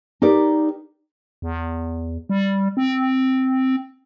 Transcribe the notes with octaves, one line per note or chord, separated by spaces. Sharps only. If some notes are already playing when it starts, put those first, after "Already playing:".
D#4 G4 A#4 D5
E2
G3
C4